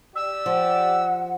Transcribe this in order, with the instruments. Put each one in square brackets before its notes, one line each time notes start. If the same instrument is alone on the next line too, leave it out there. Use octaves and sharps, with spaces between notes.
[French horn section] G4 D5 [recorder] E6
[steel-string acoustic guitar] F3 [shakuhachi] F#5